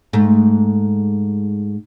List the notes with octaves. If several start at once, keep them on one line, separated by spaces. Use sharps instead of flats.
G#2 A3